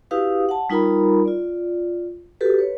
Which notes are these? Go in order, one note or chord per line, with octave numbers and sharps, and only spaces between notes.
E4 F#4 G4 B4 F5 D#6
F#5 A5
G3 D#4 F4 A#4 A#5 B5
F4 D5
F#4 G4 A4 B4
B4 C#5